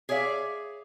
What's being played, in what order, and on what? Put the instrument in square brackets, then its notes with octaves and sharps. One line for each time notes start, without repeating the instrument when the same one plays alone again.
[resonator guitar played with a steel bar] G#4 C#5 D5 E5 F5